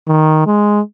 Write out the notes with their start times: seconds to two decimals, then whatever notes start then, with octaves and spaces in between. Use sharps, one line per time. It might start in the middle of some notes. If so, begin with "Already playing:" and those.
0.08 D#3
0.46 G#3